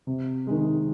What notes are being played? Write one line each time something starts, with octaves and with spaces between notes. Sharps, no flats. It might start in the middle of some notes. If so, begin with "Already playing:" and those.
C3
D#3 G#3